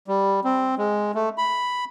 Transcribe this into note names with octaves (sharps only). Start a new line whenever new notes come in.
G3
C4
G#3
A3
B5